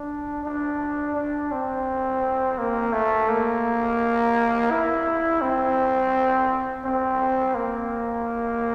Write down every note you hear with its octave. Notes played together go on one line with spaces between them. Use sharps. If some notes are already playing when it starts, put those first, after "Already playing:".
Already playing: D4
D4
D4
C4
A#3
A3
A#3
E4
C4
C4
A#3